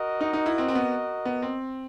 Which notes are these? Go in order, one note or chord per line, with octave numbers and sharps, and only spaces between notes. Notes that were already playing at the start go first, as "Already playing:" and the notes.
Already playing: F#4 A#4 D#5
D#4
D#4
E4
C4
C4
B3
B3
C4